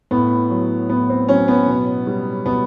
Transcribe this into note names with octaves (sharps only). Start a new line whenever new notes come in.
A2 B3
F#3
A2 B3
C4
F#3 C#4
B3
B2
G3
B2 B3